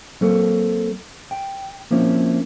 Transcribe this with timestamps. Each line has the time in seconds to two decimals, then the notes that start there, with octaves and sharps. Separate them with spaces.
0.21 F#3 A#3 C4 A4 A#4
1.31 G5
1.91 F3 A#3 C4 C#4 E4